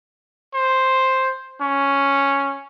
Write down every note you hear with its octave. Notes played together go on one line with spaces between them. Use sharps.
C5
C#4